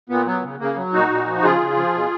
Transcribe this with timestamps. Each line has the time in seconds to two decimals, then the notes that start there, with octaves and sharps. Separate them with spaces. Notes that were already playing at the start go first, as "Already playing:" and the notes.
0.09 A#2 B3
0.26 F#3 B3
0.43 C#3
0.60 C#3 A#3
0.76 F#3
0.93 A#2 D#4 F#4
1.10 A#2
1.27 F3
1.43 C#3 F4 G#4
1.61 C#3
1.76 F3
1.94 B2